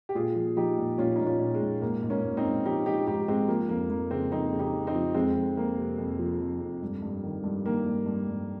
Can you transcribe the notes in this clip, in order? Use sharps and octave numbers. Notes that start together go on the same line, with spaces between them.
G4
A#2 F4 G#4
F3
F3 D#4 G4
A#2
A#2 C#4 F4
A#2 D#4
C#4 F4
A#2
G#3
A#2
G#2 A#3
G#2
A#3 C#4
G#2
C4 D#4
G#2
F3 D#4 G4
F3 D#4 G4
G#2 D#4 G4
G#2 G#3 C4
F3 A#3
F2 A#3
F2 A#3
C#3 G#3 C4
F2 C4 D#4
C#3
D#4 G4
F2
C4 D#4
F3
F2 G#3 C4
F2
F2 A#3
C3
F2
F3
F2
F2
G2
G2
D#3
G2
D#3 A#3
G2
G2
G2